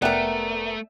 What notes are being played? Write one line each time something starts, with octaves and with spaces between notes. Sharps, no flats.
F1 A3 B3 A#4 D5 E5 G5